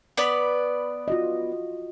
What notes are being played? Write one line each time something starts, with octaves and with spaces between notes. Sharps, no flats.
B3 B4 D5
F4 F#4 D#5